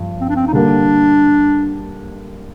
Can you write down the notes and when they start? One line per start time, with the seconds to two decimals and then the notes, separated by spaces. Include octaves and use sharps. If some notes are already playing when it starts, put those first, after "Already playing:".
Already playing: G2 F3
0.21 C4
0.29 D4
0.36 C4
0.47 D#4
0.53 D3 G3 A#3 D4